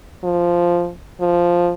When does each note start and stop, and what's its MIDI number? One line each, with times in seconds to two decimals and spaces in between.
0.24 0.90 53
1.21 1.72 53